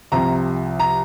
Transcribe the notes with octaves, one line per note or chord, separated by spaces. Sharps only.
C2 C3 F3 A#5
A#5